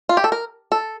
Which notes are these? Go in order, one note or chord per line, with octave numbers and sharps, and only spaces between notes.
F4
G4
A4
A#4
A4